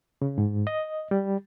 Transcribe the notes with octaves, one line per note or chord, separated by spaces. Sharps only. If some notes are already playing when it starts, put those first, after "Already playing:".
C#3
G#2
D#5
G3